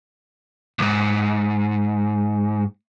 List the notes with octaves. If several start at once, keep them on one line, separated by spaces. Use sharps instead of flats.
C#2 G#2